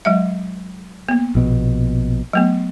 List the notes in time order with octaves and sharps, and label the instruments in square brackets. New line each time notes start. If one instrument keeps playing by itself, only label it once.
[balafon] F#3 G#3 E5
A#3 B3
[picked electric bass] A#1 B2
[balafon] F#3 A3 B3